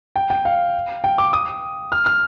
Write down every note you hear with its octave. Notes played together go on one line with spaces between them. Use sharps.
G5
G5
F5
G5
D6
D#6
F6
F6